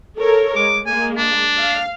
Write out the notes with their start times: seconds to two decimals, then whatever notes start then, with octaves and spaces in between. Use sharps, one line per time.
0.18 A4 A#4 C#5
0.56 G#3 D6
0.86 G#3 A#3 G#5
1.17 D4
1.58 F5